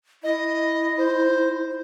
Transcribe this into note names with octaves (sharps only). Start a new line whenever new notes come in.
E4 D#5
C5